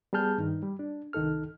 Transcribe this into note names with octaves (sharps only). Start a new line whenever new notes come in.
G3 B3 G#4 A5 F6 G6
G2 D#3 D#4
G3
D4
C2 D#3 D#4 A4 F6